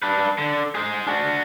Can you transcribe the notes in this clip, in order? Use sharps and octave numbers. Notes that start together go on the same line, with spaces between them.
D4 B4
D3
G#4 C5
D4 F#4